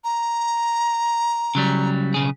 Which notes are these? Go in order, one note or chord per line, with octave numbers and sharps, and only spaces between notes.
A#5
C#3 F#3 G3
B1 C#3 G#4